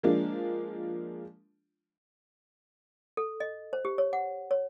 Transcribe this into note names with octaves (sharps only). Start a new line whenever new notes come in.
F3 G#3 A#3 D4 F4
A4
D#5
C5
G4
C#5
F#5
C#5